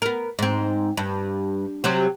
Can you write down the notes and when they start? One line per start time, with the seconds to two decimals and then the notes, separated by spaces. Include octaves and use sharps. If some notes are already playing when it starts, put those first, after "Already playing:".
0.02 B3 A#4
0.39 G#2 C4
0.97 G2
1.84 C3 F#3 C4